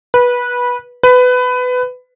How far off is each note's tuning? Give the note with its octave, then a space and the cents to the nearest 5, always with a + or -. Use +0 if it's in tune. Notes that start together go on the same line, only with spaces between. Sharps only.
B4 -15
B4 +20